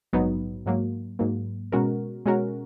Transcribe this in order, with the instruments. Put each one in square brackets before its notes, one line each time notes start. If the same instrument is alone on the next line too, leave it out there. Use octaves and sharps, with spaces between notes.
[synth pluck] A#1 G#2 F#3 B3 D#4
G#2 F#3 A#3
G#2 F#3 A#3
B2 G#3 C#4 F#4 A#4
B2 G#3 C#4 F#4 A#4